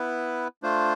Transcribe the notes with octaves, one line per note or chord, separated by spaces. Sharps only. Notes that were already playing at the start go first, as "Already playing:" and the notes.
Already playing: B3 E4 B4
A3 D4 F4 C5